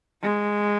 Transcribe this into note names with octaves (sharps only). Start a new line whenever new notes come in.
G#3